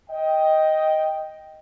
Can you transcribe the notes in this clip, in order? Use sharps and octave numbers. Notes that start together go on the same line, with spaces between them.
D#5 G5